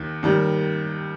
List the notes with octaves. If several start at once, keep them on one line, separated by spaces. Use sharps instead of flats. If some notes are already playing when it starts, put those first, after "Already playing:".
Already playing: D#2 D#3
D#2 D#3 G3